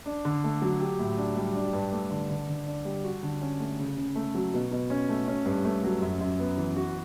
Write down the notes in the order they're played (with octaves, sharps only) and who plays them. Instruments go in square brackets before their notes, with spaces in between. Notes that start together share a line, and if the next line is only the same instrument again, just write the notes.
[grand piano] D4
D3
A3
F#3
G4
A2
D4
G3
D4
G2
A3
D3
D3
D3
D4
G3
F#4
D3
C#4
A3
C#3
C#3
A3
F#3
B2
B2
C#4
A3
C#4
G2
A3
F#3
F#2
F#2
B3
E3
F#4